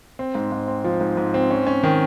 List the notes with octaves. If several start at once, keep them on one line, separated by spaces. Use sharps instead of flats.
C4
G#2
G#2
C4
F3
G#2
G#2
C4
C#4
C#4
D#3